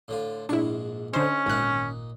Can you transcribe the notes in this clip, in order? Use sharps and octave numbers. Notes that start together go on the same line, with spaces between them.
A2 D3 F4
A#1 G#2 D4 E4 C#6
D3 C#4 D#4 C5
G#1 A#2 D#4 F#6